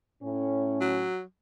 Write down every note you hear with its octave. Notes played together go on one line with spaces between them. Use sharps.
A2 C#4
F#3